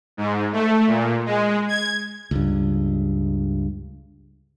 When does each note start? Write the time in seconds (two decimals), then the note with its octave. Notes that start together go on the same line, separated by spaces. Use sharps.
0.17 G#2
0.53 A3
0.87 A#2
1.26 G#3
1.68 G#6
2.31 C#2 G2